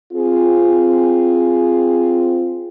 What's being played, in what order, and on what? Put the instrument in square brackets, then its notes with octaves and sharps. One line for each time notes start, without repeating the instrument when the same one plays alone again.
[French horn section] C4 F4 G#4